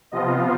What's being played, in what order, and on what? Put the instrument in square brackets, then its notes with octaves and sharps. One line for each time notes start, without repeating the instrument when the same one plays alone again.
[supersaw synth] C3 F3 B3 F4 D#5